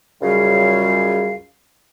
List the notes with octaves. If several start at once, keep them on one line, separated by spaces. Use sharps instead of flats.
C#2 F#2 C#3 G3 F5